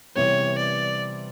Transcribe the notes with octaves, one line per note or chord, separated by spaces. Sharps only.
C3 E3 G3 B3 C#5
D5